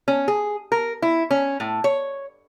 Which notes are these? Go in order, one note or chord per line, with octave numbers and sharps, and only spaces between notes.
C#4
G#4
A#4
E4
C#4
A2
C#5